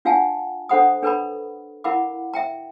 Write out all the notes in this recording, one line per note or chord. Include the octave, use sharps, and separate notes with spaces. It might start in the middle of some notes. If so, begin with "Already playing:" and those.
D4 F4 F5 F#5 G#5 A5
D4 A4 C5 F#5 B5 D#6
D4 A4 B4 D5 A#5 B5
E4 A#4 F5 F#5 B5 D6
E5 G5 A#5